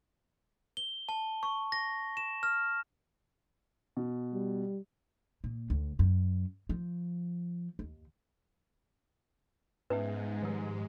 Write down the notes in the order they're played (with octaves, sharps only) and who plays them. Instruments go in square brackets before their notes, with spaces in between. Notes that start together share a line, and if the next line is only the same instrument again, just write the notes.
[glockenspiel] G7
A5
C#6
A#6
E7
F6
[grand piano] B2
[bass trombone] G3
[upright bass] A#2
D2
F#2
F3
D#2
[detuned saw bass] G#2 [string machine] G#3 [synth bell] B3 C#4 E5 [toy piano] B4
[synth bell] D#3 F3 G4